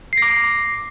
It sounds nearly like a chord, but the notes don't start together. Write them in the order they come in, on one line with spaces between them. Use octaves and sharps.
C7 A#6 D6